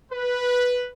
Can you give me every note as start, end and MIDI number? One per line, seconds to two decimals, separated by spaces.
0.12 0.89 71